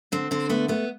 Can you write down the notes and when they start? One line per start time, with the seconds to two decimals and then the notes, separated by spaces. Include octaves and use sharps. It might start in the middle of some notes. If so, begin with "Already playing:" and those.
0.12 D3 C4
0.31 D3 C4
0.49 A3 B3
0.68 A3 B3